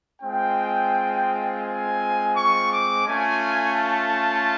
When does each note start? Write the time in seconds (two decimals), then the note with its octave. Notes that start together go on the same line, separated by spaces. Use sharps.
0.22 G#3 C4 F4 G5
1.63 G#5
2.34 C#6
2.70 D6
3.05 A3 C#4 F4 G#5
3.76 A5